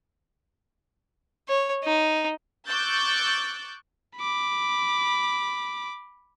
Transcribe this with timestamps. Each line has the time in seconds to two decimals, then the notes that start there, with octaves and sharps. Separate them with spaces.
1.49 C#5
1.84 D#4
2.67 C#6 D6 E6 F#6 G6 A6
4.17 B5 D6